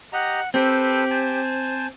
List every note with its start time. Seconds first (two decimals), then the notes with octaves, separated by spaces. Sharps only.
0.13 G4 D#5 F#5 A#5
0.54 C4 G4 A4 B4 C5
1.10 C5 G#5 A5